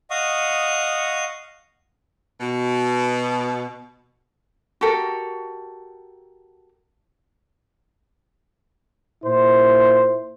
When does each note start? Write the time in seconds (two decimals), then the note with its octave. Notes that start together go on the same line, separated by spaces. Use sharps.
0.10 D#5 F5 F#5 C#6 D#6
2.40 B2
4.81 F#4 G4 A4 A#4
9.25 A#2 E4 C5